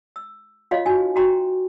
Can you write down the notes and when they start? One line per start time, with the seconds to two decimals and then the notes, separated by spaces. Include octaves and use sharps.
0.16 E6
0.71 F4 C#5 D#5 F5 C6
0.86 D#4 F#4 G#5
1.16 F#4 G5 A#5 C6